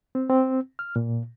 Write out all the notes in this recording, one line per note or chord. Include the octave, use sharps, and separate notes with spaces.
C4
C4
F6
A#2